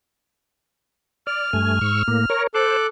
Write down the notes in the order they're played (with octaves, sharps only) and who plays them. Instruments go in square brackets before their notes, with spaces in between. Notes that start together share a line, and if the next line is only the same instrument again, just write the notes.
[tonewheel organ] D5 [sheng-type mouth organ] F6
[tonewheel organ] G2 A3 G#5
G#2 C#6 E6
A2 A#3
A#4 C#5
[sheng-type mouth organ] A4 D6 F#6 [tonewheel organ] C5